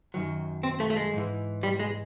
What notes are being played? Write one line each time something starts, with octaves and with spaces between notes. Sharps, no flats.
F#2 D#3 F#3
C4
A3
A3
G#3
G#2 E3
G3
G#3